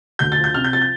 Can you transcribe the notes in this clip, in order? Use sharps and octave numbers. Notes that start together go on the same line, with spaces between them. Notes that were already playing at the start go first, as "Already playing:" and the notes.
D2 G6
A6
F3
G6
C3 F6
G6
F3 A6
G6